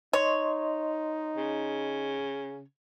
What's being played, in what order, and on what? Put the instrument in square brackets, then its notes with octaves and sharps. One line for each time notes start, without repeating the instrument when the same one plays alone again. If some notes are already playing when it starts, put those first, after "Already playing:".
[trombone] D#4 [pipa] C#5 [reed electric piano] D#5 C6
[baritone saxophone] C#3